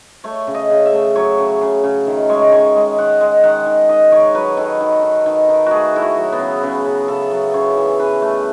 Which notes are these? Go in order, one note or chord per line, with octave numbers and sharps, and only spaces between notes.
A3 C#5
C#3
D#5
C#3
E5
A3
F#3 C#5
C#3
C#3
C#3
D#3
G#3 C#5
D#3 C#5
G#3
D#3 F#5
G#3
D#3 F#5
D#3
D#3 D#5
D#3 C#5
F#3 B4
D#3 A4
D#3
D#3
D#3
D#3
A3 F#4 G#4
A3 E4
F#4
F#3
B3
C#3
C#3 B3
C#3
C#3 A4
F#3
C#3 C#5
E3
C#3 B4
A3